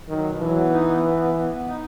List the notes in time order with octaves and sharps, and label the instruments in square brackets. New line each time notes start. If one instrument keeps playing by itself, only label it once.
[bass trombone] D#3 [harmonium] F#3
[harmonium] B2
[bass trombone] E3 [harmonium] F#3
[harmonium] B3
D#4
B3
B3
B3
B3
B3
D#4